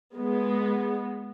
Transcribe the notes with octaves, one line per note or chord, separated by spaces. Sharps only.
G#3 B3